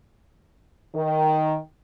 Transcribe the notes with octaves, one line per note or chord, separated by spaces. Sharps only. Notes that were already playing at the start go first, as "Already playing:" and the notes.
D#3